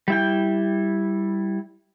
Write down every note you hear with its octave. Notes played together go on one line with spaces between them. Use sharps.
G3 E4 G5